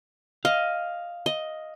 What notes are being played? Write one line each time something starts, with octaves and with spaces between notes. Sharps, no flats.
D#5 F5
D#5